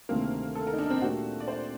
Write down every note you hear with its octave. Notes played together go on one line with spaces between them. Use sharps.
D2 C3 D#3 A3 A#3 C4
A4
A#4
D#4
D4
C4
A#2 A3 D4 F#4 G4 A#4
D5
C5